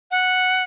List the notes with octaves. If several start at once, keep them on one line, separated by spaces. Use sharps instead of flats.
F#5